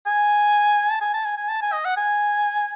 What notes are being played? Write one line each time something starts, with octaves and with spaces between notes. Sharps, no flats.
G#5
A5
G#5
A5
G#5
G#5
A5
G#5
D#5
F#5
G#5